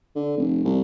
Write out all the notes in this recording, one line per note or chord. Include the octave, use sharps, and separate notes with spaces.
D3
F1
C2